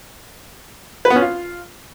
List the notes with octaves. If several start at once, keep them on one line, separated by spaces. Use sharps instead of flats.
B4
B3
C#4
F4